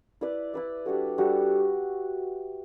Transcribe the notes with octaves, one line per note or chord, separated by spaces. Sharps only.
E4 B4 D5
E4 B4 D5
G3 D4 F#4 A4
G3 D4 F#4 A4